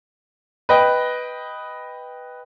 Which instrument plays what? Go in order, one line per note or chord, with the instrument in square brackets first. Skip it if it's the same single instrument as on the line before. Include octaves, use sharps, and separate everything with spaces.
[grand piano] B4 D#5 G5